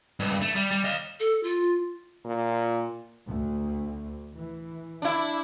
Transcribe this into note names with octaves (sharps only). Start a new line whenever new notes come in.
C#2 G2
A3
G3
G3
D#5 F5
A4
F4
A#2
D2
E3
D4 E4